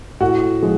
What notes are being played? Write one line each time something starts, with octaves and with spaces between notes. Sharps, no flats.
A2 F#4
F3 G#3